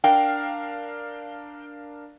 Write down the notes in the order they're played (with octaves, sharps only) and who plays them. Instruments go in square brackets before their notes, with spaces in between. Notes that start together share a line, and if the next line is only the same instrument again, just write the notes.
[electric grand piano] D4 A#4 F5 [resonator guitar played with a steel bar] G5